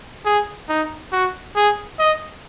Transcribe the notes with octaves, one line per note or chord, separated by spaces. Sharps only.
G#4
D#4
F#4
G#4
D#5